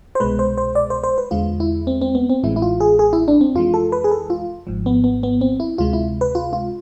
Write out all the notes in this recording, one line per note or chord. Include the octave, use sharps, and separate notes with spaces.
C5
C2 B2 G#3 B4
C5
C5
D5
C5
C5
B4
E2 D3 G#3 F4
E4
C4
C4
B3
C4
A1 A2 E3 G#3 E4
E4
F4
G#4
G#4
E4
D4
C4
F2 E3 G#3 F4
A4
B4
G#4
A4
F4
G#1 G#2 F3
B3
B3
B3
C4
E4
D2 C3 G#3 F4
E4
B4
F4
F4